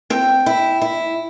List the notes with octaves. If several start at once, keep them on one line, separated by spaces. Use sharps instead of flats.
C4 G5
E4
E4